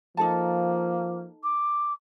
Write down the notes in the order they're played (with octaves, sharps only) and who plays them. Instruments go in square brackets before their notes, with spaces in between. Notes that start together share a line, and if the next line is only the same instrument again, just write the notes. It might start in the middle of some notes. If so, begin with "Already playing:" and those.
[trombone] F3 [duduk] A#3 [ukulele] D#4 A4 A5
[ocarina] D6